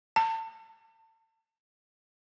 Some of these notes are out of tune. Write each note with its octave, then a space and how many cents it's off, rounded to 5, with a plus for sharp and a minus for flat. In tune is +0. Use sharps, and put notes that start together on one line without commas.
A5 +30